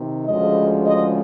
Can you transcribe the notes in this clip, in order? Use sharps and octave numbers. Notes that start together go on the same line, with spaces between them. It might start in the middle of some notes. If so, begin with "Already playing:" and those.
Already playing: C3 D#3
D2 C#3 F3 G#3 D#5
D#5